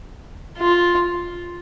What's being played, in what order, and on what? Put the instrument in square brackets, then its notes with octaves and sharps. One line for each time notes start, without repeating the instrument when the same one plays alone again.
[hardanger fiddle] F4